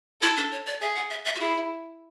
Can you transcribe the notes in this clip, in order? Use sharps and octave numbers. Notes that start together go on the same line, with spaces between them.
E4 A4
D4
C#5
D5
G#4 E5
F#5
E5
E5
F#4
E4 G#4